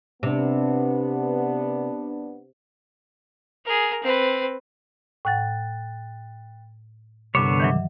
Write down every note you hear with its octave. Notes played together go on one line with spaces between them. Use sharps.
C3 B3 D4
G#4 A#4
C4 B4
A2 F#5 G5 F#6 A6
C2 G2 D3 B3 C#5 D6 E7
D#3 E3 F#3